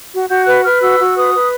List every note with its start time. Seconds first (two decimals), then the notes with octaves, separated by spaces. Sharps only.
0.13 F#4
0.29 F#4 G6
0.46 B4 F#6
0.64 B4 F6
0.81 F#4 E6
1.00 F#4
1.17 B4 D#6
1.34 B4